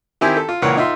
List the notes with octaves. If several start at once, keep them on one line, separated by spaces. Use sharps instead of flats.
D#3 C4 E4 G4 G#5 C6
A4
F4
C#2 A#2 E3 A#4 C#5 F#5
D#4 F4 E5 C6